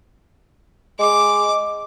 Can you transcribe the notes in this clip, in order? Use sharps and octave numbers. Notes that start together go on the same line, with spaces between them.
G#3 D6